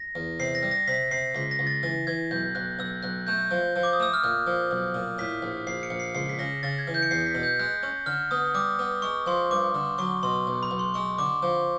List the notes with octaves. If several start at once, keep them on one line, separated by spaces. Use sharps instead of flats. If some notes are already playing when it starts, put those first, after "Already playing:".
Already playing: A#6
E2
C3 C7
A#6
G3
A#6
C3 B6
C3 C7
C#2 B6
A#6
C#2
A6
E3 A6
E3 G#6
B1 G6
B1 F#6
B1 E6
B1 F#6
A3 G6
F3
F3
D6
D#6
A3 E6
F6
A#2 F#6
F3
B1
A#2
A2 B6
A#1
A#1 C7
C#7
A#1
C7
C#2 C7
B6
C#3 A#6
C#3 A6
G#6
E3
G6
C#7
E2 C7
B6
B2
G6
G#3 F#6
C#4
D3 F6
B3 D#6
G3 D6
B3
G#3 C#6
F3 C6
G2 D6
D3
F#3 C#6
B2 C6
B1
B5
B1
C6
G#3 C#6
D3 D6
F3